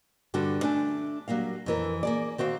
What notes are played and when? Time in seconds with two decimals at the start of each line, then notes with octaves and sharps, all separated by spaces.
0.34 G2 D3 G3 F#4 A4
0.62 A3 D4 G#5
1.28 F#3 G3 A#3 F5
1.66 F2 E3 A#4
2.03 A#3 G#4 D5
2.38 D#3 C4 F#4 F5